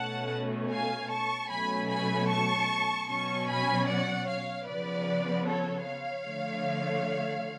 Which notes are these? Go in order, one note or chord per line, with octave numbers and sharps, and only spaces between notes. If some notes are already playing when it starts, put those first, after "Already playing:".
Already playing: B2 A3 C#4 F#5 A5
F5 G#5
A5 C#6
B2 F#3 A3 C#4 G#5 B5
G#5 B5
A5 C#6
B2 F#3 C#4 A5 C#6
G#5 B5
D5 F#5
C#5 F5
C#3 F3 B3 B4 D5
A4 C#5
C#5 F5
D3 F3 A3